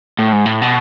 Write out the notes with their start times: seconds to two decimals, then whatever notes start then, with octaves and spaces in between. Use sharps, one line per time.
0.19 A2
0.33 G#2
0.46 A2
0.62 B2